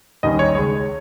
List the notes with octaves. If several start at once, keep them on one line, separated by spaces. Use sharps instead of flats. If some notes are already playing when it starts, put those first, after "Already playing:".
D#2 D#3 G3 C#4 D#5
C#5
C#2 C#3 G#3 C#5